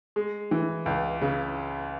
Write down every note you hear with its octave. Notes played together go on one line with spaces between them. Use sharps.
G#3
E3
C#2
C#3